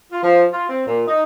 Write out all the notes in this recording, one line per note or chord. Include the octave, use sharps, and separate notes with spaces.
F4
F3
F4
C4
A#2
D#4